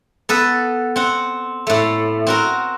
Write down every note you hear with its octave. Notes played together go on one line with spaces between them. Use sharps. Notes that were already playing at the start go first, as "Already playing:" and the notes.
B3 A4 B4
C4 F#5
A2 A3
C4 F#4 A#4